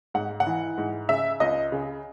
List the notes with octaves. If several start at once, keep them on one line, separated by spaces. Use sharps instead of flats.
G#2 F#5
F#5
E3
G#2
C#3 E5
C#2 D#5
C#3